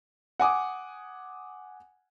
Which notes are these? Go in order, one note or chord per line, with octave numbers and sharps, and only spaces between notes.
F#5 G#5 D6 D#6